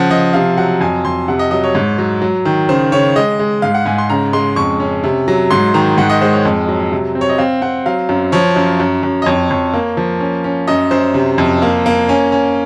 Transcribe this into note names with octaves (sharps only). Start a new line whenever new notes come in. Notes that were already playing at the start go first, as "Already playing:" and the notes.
Already playing: C#3 F3 F#5
F3 D#5
C3 F5
F#3 F#5
F2 G#5
F2 C6
C3 F#5
D#5
F#3 D#5
C#5
G#2
F#3
F#3
D#3
C#3 C5
C#3 C#5
G#3 D#5
G#3
G#2 F5
F#5
G#2 G#5
C6
C#3 A#5
G#3 C6
F2 C#6
C#4
C3
F#3
G#2 C6
D#3 A#5
G#2 F#5
D#5
G#3 C5
C#5
F2
F#3
C3
C4
C#5
D#5
C4 F5
C4 F#5
F#3 F5
F#2
F3 C#5
F#2
F#2
F#2
D#5
F2 C#5
F2 C#5
A#3
F3
C#4
C#4
F#2 D#5
F#2 C5
C3
F2
A#3
A#3
C#4 G#5
C#4